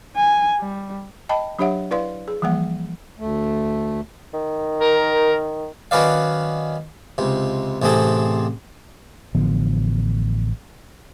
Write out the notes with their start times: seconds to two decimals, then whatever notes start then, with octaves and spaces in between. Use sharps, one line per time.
0.16 G#5
0.59 G3
1.29 D#5 G5 A5 B5
1.59 F#3 D4 G4 C#5 E5 F#5
1.91 E4 B4 D5 F5 C6
2.28 G#4
2.42 E3 F3 G3 A#3 F#5
3.19 D2 A3
4.34 D#3
4.81 A#4
5.91 D#3 F#3 C#4 B4 D5 F5
7.18 C#2 C3
7.82 A1 C3 C4 G#4 A4
9.35 A1 D3 F3 B3